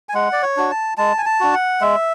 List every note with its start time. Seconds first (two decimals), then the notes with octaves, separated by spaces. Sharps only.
0.09 G#5
0.14 G#3 F#5
0.32 D5
0.42 C#5
0.57 D4 F#4
0.70 A5
0.98 G#3 A5
1.18 G#5
1.26 A5
1.40 D4 F#4
1.54 F#5
1.81 G#3 E5